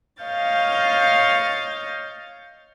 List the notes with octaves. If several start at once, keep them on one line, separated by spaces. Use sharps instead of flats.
C#5 D#5 F5 F6 G6 A6